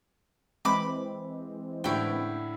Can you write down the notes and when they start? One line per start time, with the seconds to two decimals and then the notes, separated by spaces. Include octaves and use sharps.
0.65 E3 G#3 C4 B5 D6
1.84 A2 D3 C#4 E4 G5